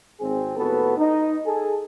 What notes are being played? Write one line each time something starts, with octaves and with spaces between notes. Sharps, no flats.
G#1 C4 G#4
D#2 A2 B3 F#4 A4 B4
D#4
G#4 A4